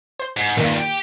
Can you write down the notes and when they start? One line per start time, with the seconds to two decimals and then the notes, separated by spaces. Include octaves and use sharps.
0.19 C5
0.37 G#2
0.57 E2 G2 A#2 D#3
0.78 G4